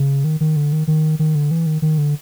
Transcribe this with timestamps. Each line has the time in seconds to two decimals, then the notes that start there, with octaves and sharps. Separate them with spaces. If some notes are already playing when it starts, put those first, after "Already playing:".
Already playing: C#3
0.24 D#3
0.41 D#3
0.56 D3
0.72 D#3
0.88 D#3
1.19 D#3
1.35 D3
1.51 E3
1.66 D#3
1.82 D#3
1.98 D3